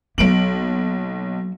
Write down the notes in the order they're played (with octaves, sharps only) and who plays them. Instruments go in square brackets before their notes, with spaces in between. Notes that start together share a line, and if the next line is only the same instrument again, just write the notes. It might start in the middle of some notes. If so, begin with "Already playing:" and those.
[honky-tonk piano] B1 D7 F#7 [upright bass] F#3 A#3